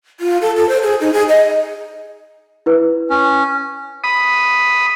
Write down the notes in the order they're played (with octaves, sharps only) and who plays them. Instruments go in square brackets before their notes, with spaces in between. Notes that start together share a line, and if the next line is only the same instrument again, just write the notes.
[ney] F4
A4
A4
C5
G#4
D#4
G#4
D#5
[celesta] E4 B4
[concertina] C#4
[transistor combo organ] B5 D#6